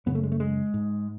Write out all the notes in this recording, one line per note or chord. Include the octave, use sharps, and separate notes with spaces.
F#2 C#3 B3
A3
G#3
A3
G#3
G#2